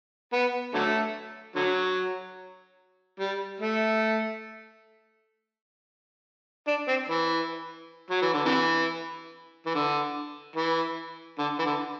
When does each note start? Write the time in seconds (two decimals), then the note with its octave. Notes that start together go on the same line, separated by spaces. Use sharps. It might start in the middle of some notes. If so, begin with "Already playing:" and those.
0.33 B3
0.74 D3 F#3 A3
1.56 D3 F#3
3.20 G3
3.60 A3
6.67 D4
6.88 C4
7.09 E3
8.11 F#3
8.22 E3
8.34 D3
8.46 C3 E3
9.66 E3
9.75 D3
10.56 E3
11.39 D3
11.59 E3
11.66 D3